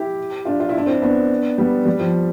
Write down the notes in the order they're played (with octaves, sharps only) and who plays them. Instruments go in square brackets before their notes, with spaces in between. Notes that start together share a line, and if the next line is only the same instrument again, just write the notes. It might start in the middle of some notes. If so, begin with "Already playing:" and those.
Already playing: [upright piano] E4 G4
D4 F4
F4
E4
D4
C4 E4
B3 D4
G3 B3
G3
F3